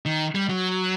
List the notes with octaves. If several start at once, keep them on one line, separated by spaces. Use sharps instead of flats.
D#3
G3
F#3